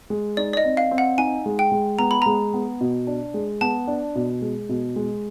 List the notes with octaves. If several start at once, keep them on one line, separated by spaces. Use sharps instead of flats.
G#3
D#4 D5
D5
D#5
C4
F5
C4
F#5
D#4 G#5
G#3
G5
G#3
B3 A#5
B5
G#3 A#5
B3
B2
D4
G#3
B3 A5
D4
B2
G#3
B2
G#3